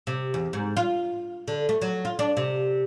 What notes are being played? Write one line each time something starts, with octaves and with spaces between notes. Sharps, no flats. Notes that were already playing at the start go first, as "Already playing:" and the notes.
C3
E2
G#2
F4
D3
A3
F#3
F4
D4
C3